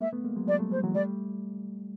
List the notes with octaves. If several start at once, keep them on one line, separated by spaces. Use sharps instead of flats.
G#3 A#3 E5
A3 B3
G#3 A#3
F#3 G#3
F#3 G#3 D5
G3 A3
F#3 G#3 C5
E3 F#3
G3 A3 D5